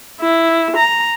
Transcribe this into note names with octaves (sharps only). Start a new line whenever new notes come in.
E4
A#5